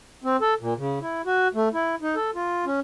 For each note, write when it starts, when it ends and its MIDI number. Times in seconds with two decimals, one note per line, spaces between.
0.24 0.37 60
0.41 0.54 69
0.61 0.74 46
0.78 0.99 49
1.01 1.22 64
1.26 1.48 66
1.54 1.69 57
1.73 1.95 64
2.02 2.15 63
2.16 2.31 69
2.35 2.65 65
2.66 2.80 61